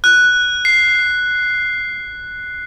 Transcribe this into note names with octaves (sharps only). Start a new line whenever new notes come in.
F#6
C7